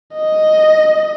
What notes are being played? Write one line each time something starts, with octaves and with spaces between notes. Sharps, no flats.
D#5